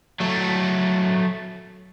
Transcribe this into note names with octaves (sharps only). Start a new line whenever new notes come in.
F#3 A3